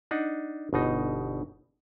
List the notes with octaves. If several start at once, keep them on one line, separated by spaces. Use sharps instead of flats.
D4 D#4 F#5
G1 B2 D#4